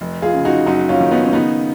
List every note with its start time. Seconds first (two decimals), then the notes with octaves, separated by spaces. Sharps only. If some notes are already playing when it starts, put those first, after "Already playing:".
0.01 F1
0.22 F4 G#4
0.34 C#3
0.45 D#4 F#4
0.66 F#1 D#4 F#4
0.89 C#4 F4
1.01 D#3
1.11 B3 D#4
1.25 C#4
1.33 C#3 B3 D#4